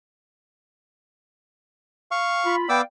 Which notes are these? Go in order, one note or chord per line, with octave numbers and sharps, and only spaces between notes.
F5 C#6
F4 B5
B3 D5 F5 G5 D6 E6